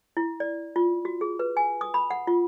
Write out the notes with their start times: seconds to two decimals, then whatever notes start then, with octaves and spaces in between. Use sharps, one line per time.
0.17 E4
0.40 D5
0.76 F4
1.05 F#4
1.21 G#4
1.39 B4
1.57 G#5
1.81 D#6
1.94 B5
2.10 F#5
2.27 F4